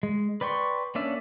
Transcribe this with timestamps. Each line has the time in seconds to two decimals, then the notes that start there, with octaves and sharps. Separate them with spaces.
0.03 G#3
0.41 B4 D5 G5 C6 C#6
0.95 A#3 C#4 D4 D5 E5